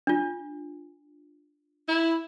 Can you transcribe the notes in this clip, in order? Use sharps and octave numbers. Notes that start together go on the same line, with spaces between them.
D4 F4
E4